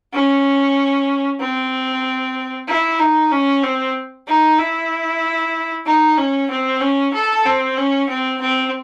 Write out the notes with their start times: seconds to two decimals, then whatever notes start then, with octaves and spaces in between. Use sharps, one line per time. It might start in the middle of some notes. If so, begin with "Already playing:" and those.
0.13 C#4
1.40 C4
2.68 E4
2.99 D#4
3.31 C#4
3.63 C4
4.27 D#4
4.59 E4
5.86 D#4
6.18 C#4
6.50 C4
6.81 C#4
7.14 A4
7.46 C4
7.77 C#4
8.09 C4
8.41 C4